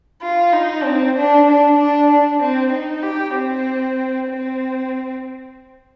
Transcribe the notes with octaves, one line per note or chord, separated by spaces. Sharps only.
F4
D#4
C4
D4
D4
D4
D4
C4
D#4
G4
C4
C4